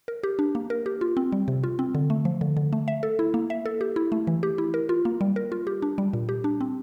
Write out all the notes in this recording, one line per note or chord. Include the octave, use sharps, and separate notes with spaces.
A#4
G4
D4
A#3
A#4
G4
F4
C4
G3
C3
F4
C4
D3
A3
F3
D3
D3
A3
E5
A4
E4
A#3
E5
A4
G4
E4
A3
E3
G4
E4
A#4
F4
A#3
G3
A#4
F4
G4
D4
G3
A#2
G4
D4
C4